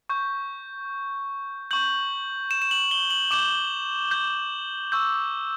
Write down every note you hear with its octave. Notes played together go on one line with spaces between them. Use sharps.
C#6 G6
C#6 G6 F#7
E7
E7
F#7
G7
F#7
D6 G6 E7
G6
C#6 E6 G6